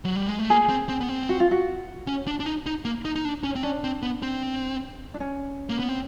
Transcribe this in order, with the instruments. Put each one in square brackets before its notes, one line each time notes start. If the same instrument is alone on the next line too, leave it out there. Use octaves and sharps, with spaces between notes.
[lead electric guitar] F#3
G3
G#3
A3
[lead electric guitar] A#3 [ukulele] G#4
[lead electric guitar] C4
C4
B3
C4
[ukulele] F#4
F4
F#4
[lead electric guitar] C#4
D4
D4
D#4
D#4
A#3
D#4
D#4
D4
C#4
C4
[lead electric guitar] C#4 [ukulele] D4
[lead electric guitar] C4
B3
C4
[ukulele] D4
C#4
[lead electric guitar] A#3
B3
C4